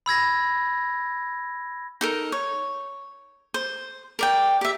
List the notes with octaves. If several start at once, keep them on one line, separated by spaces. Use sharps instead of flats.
B5 E6 G#6 A#6
D#4 A4 A#4
C#5
C5
A#4 D5 G5
G4 E5